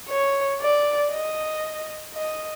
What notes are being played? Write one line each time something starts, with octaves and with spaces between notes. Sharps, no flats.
C#5
D5
D#5
D#5